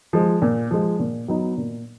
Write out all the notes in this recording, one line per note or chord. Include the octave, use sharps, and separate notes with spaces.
F3 G#3
A#2
F3 G#3
A#2
F#3 B3 D#4
A#2